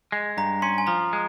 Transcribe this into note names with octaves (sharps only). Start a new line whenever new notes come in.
G#3
G2 A#5
C#4 C6
G#5
F3 A#5
G#3